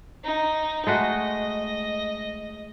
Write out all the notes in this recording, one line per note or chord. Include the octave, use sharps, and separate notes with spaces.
D#4
G#3 A3 F#4 D#5